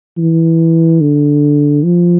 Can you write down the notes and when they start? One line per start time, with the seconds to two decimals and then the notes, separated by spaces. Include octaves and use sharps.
0.17 E3
1.01 D3
1.84 F3